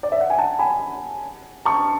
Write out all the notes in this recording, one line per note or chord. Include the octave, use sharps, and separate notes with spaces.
D5
E5
F#5
G#5
F#5 A5
G#5 B5
A5 C#6